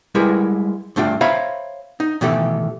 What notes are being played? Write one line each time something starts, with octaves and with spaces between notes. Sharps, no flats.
G3 G#3 E4 A#4 B4
G2 A3 D4 F4 G5
C5 C#5 E5 F5 A#5 B5
D#4
B2 D#3 E3 A3 G4 A4